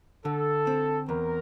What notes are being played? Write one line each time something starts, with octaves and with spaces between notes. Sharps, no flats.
D3 A4
C4
E2 A#4